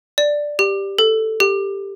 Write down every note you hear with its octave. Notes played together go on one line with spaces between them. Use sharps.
D5
G4
A4
G4